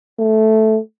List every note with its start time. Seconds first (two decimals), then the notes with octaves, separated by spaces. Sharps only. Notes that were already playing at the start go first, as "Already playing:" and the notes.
0.19 A3